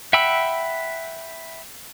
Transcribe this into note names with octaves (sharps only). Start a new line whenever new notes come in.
E5 F#5 G5 B5 E6